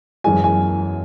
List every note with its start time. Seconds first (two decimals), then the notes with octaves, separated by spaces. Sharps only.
0.24 F#2 E3 G#3 G#5
0.44 G#5